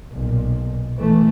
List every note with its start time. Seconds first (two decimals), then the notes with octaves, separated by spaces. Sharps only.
0.13 B1 A#2
0.98 E3 A3